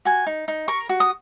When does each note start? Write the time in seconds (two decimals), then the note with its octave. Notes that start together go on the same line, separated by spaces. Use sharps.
0.05 F#4 G#5
0.26 D#4
0.48 D#4
0.68 A#4 C#6
0.89 F#4
1.00 D#6